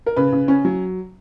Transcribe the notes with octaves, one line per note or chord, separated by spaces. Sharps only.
A#4
C#3 B4
C#3
C#4
F#3